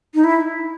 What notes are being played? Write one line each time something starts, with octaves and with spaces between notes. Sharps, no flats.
D#4
E4